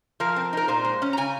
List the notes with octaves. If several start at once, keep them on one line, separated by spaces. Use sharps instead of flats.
F3 A#4
C4
D#4 A#4
A#2 C5
G#3
C#4
A#5
C#3 G#5